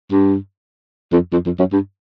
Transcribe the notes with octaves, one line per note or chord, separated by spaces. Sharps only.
G2
F2
F2
F2
F#2
G2